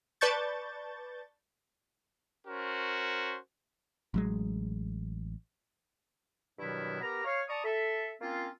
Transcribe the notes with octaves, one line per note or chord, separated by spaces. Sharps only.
B4 D5 A5 C#6 G6 A6
C#4 F#4 A#4 C5
A1 F#3 G#3
G2 B2 D#3 F#3 B3 E4
B3 G4 A#4 A#5
C#5 F5
D5 A5 A#5 C#6 D#6
A4 E5
A#3 C4 C#4 F4